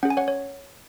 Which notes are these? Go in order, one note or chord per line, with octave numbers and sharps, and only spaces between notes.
C#4 G#4 F#5
G#5
C#5 F#5
C#5